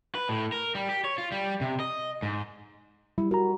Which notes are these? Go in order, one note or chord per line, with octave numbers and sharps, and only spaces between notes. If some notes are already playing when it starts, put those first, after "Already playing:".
B4
A2
A#4
G3
G4
C#5
F4
G3
C3
D#5
G#2
G3 E4
F#4 A#4 A#5